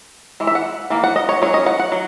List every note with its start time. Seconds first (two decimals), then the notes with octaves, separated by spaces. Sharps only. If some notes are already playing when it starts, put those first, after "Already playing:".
0.40 E3 G#3
0.47 E5
0.55 F#5
0.90 E3 A#3
1.04 F#5
1.16 D#5
1.29 C#5
1.42 F#3 C#4 C#5
1.54 D#5
1.66 F#5
1.80 F#5
1.92 F#3